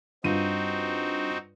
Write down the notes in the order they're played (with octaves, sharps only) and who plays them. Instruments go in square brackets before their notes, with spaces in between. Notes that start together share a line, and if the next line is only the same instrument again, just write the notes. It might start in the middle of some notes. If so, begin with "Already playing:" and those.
[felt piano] G2 F4 D#7 [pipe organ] C4 D#4 F#4